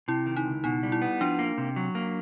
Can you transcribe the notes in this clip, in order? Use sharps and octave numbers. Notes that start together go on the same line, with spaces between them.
C3 E4
D#3
D#4
C#2
B2 D#4
G3
E4
B3
F3 D4
A#3
C3
F#3
A#3